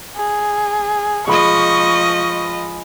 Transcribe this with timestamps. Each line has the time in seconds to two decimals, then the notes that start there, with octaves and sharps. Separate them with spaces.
0.16 G#4
1.28 F3 G#3 D#5 B5 C#6